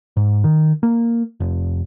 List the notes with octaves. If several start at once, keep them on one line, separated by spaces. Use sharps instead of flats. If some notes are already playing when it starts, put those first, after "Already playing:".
G#2
D#3
A#3
F1